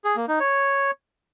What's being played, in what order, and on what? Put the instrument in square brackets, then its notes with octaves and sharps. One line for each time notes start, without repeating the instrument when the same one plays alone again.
[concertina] G#4
A#3
D#4
C#5